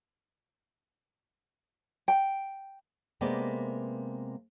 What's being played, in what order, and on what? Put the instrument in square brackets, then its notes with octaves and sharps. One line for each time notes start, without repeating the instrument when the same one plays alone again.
[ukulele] G5
[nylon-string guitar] C3 G#3 A#3 B3 B4 D5